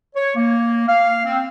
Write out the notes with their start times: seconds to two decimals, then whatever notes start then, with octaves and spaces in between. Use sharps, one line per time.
0.16 C#5
0.36 A#3
0.88 F5
1.25 C4